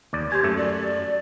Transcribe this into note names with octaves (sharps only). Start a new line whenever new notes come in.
D#2 D5
G4 C5 G#5
F#2 A3
D5